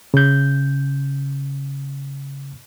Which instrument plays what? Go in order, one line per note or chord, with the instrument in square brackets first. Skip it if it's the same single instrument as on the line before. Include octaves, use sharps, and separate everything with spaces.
[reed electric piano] C#3 G6